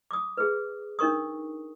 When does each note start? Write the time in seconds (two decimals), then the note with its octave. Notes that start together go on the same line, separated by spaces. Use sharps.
0.11 D6 D#6
0.37 G#4 B4
0.99 D4 D#4 A#4 C#6 D#6